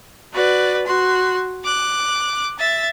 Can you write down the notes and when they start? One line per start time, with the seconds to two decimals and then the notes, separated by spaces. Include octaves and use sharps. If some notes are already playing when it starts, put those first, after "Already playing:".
0.34 F#4 B4 D5
0.86 F#4 C6
1.64 D6 F#6
2.58 E5 A6